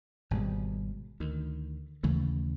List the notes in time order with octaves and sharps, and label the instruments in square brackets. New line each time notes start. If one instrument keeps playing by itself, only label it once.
[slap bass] G#1 B2 G3 G#3
D2 D#3
D#2 C#3 E3 A3